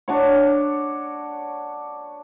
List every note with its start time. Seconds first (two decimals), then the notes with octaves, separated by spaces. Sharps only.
0.08 D4 F#4 C#5